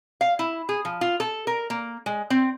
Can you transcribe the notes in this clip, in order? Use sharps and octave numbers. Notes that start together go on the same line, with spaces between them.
F5
E4
G#4
F3
F4
A4
A#4
A#3
G#3
C4